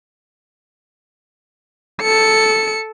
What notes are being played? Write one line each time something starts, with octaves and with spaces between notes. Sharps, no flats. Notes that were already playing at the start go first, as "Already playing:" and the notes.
A4 C#7